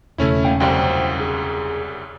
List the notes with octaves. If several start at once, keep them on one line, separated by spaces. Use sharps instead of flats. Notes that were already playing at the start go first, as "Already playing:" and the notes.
E1 C#3 A3 C#4 E4
A#3 F5 G5
C2 F#2 G3 C5 F5 G5
G#4